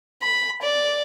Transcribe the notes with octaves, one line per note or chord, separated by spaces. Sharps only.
B5
D5